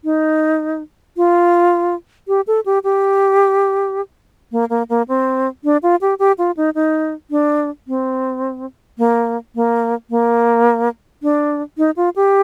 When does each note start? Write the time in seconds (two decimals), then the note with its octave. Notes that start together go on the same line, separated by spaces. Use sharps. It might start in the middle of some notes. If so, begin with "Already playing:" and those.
0.04 D#4
1.17 F4
2.28 G4
2.47 A4
2.66 G4
2.84 G4
4.52 A#3
4.70 A#3
4.89 A#3
5.08 C4
5.64 D4
5.83 F4
6.01 G4
6.19 G4
6.38 F4
6.57 D#4
6.75 D#4
7.31 D4
7.88 C4
8.98 A#3
9.55 A#3
10.10 A#3
11.23 D4
11.78 D#4
11.96 F4
12.16 G4